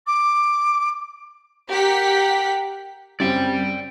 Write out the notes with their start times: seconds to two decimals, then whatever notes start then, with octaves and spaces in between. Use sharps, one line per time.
0.06 D6
1.70 G4 A#4 F#5 B6
3.20 F#2 C#3 G3 C4 D5 G5